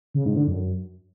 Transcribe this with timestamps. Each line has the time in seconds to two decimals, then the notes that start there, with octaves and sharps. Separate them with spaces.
0.14 C#3
0.25 G#2
0.36 D3
0.47 F#2